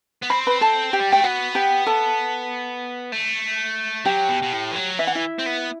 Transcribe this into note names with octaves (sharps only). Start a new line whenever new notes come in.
B3
C4 B5
B4 B5
A4 A5
G4 G5
G3
A3 G5
B3 F#4 F#5
G4 G5
A4 A5
A3
F#3 G4 G5
B2
B2
A2
E3
F#3
E3 E5
F#5
E4 E5
C4
B3